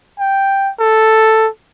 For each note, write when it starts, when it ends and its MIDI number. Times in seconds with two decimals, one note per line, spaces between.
0.20 0.71 79
0.80 1.48 69